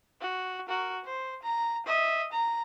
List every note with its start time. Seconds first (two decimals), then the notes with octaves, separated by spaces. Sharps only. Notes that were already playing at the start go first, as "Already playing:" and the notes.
0.21 F#4
0.67 F#4 A#4
1.04 C5
1.43 A#5
1.86 D#5 E5
2.32 A#5